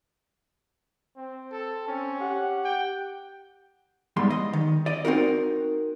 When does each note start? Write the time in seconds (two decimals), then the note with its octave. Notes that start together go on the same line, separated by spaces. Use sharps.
1.16 C4
1.52 A4
1.88 C4 C#4
2.20 G4 F#5
2.65 G5
4.16 E2 G#2 G3 C6
4.30 D#5
4.53 D#3
4.86 D5 D#5
5.05 C4 D#4 F#4 A#4